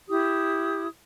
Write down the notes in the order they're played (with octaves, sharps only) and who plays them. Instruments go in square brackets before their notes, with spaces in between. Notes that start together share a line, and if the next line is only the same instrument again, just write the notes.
[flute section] E4 G4 D#6